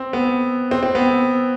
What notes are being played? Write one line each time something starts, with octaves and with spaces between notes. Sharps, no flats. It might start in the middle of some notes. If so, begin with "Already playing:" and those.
Already playing: C4
B3
C4
C4
B3